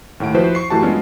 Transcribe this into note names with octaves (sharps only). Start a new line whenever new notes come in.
D#2 A2 F#5 D7
F3 E4 F#4 B4 C5
C#6 C7
F#2 E3 A3 F#4 G4 A5
F#3 G#3 B3 C#4 D4 F4